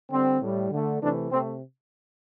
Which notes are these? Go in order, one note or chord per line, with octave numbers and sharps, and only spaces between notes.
D3 G3 C4
A2 G3
D3 A3
C3 E3 A3 D4
C3 A3 C4